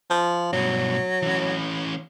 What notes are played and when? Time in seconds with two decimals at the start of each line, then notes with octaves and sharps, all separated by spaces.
0.10 F3
0.53 G2 B2 F#3
1.22 E3 C#4